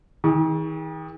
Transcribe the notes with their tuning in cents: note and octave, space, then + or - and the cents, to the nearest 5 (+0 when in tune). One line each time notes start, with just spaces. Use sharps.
D#3 +45 G#4 -25